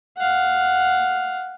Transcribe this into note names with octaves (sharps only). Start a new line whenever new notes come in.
F5 F#5